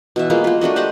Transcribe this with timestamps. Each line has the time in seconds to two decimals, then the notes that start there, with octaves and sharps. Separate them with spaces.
0.16 B2 E3 E5
0.30 G#3 A#3 B3 F4
0.44 A#3 F4
0.61 A3 D4 F#4 D#5
0.76 G4 C5 D#5 F#5